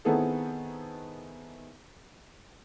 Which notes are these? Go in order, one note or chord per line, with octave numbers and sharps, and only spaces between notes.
D#3 B3 C4 E4 G#4 A4